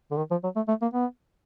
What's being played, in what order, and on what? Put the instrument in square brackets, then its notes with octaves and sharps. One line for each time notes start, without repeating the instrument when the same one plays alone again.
[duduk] D3
D#3
F3
F#3
A3
A3
A#3
B3